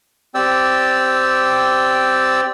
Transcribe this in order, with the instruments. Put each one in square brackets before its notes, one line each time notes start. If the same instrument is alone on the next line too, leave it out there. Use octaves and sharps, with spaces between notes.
[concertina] C4 G4 D5 G5 E6